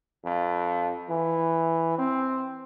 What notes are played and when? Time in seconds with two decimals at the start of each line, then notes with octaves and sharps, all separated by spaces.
0.25 F2
1.10 E3
1.98 C4